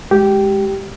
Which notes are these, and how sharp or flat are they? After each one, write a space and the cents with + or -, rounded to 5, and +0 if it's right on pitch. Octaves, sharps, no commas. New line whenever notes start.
G#3 +0 G4 -10